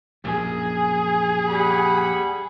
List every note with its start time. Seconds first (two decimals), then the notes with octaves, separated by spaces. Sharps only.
0.24 A#1 F#2 G#4
1.48 G3 F#5 B5